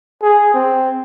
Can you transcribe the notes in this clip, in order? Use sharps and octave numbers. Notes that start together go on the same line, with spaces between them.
G#4
C4